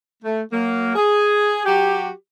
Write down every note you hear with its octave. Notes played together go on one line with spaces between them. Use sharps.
A3
F#3 A#3
G#4
F#3 F#4 G4